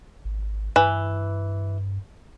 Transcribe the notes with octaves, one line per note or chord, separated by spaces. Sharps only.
G#1
G2 E3